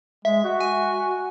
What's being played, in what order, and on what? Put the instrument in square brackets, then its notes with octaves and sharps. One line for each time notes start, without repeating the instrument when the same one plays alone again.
[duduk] G#3 [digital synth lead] E5
[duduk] F#4
[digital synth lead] G#5